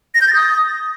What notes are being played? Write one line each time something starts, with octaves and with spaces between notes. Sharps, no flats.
A#6
G6
A6
D#6